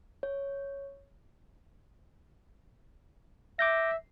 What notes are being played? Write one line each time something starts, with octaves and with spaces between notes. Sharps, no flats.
C#5
E5 D6 G6 A#6